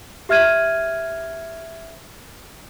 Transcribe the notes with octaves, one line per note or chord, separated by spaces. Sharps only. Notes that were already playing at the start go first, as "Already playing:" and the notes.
G4 E5 F6 G#6 D#7